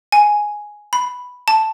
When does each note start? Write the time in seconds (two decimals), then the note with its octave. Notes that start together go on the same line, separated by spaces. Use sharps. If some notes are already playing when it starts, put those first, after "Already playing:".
0.12 G#5
0.93 B5
1.48 A5